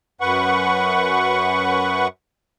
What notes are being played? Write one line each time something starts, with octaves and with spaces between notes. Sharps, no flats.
F#2 B4 F#5 C#6